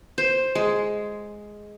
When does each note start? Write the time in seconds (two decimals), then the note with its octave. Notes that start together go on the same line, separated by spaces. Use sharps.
0.18 C5
0.55 G#3